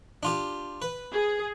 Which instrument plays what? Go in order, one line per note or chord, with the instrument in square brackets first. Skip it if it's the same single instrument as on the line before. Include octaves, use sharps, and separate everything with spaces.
[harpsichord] D4 F4 G4
B4
[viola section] G#4